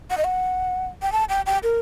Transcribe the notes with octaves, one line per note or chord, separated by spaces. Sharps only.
F#5
D#5
F#5
G5
A5
G5
G5
A#4